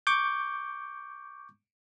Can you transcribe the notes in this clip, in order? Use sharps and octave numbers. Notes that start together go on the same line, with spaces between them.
C#6 D6 G6